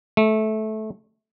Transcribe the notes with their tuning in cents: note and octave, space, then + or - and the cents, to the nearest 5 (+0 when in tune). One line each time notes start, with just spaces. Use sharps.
A3 -15